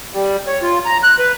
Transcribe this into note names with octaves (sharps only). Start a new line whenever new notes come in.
G3
C#5
F4
A#5
F#6
B4